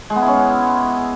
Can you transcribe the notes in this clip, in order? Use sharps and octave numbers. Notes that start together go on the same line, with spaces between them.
G#3
B3
E4
C#4